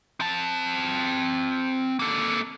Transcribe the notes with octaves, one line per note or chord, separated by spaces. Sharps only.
C4 A5
A#3 A4